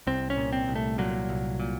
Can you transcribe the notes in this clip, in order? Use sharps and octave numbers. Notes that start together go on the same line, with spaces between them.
C2 C4
C#4
A#2
C4
C2
A3
A#2 F#3
C2
A#2